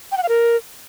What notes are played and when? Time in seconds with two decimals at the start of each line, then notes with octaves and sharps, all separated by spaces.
0.12 G5
0.17 F#5
0.23 F5
0.29 A#4